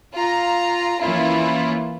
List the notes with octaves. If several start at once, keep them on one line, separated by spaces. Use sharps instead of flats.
F4 A#5
E3 A#3 C#4 E4 F4